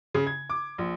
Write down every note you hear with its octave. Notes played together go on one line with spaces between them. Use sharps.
C#3
G#6
D6
A#1